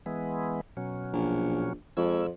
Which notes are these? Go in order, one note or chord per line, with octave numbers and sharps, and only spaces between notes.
E3 G#3 B3
B2 F#3 C#4
A#1
F2 F3 G#3 E6